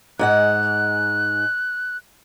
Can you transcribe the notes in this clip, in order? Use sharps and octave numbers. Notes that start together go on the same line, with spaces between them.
G#2 G#3 F#5 F#6